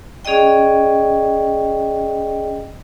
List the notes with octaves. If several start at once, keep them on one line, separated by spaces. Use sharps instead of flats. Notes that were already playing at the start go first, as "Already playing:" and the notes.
C#4 G#4 D5 D#5 G5